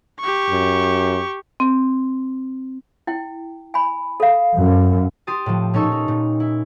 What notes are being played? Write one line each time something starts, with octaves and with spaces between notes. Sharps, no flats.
G4 C#6
F#2
C4
E4 G5
G#5 B5
A4 F5
F#2
G4 C6 D#6 A6
A2 F3
A#2 C#4 D#4 A4 C#6 E6
D#4
A#2
E4